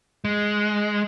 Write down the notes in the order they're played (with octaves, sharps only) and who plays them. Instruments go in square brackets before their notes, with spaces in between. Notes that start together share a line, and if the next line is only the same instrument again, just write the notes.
[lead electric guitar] G#3